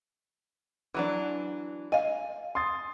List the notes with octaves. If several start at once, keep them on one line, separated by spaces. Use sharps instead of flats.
E3 F#3 D4
D#5 F5 G#5
C6 D#6 A6